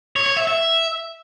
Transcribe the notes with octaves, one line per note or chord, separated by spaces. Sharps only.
C#5
C#5
E5
E5